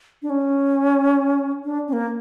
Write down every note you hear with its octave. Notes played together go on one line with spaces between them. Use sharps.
D4
C#4
D4
C#4
A#3